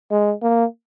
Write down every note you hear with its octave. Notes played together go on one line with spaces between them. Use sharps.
G#3
A#3